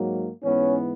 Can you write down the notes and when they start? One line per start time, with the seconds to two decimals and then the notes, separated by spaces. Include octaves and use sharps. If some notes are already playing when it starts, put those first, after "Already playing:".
Already playing: G#2 F#3 A#3
0.44 G#2 E3 B3 C#4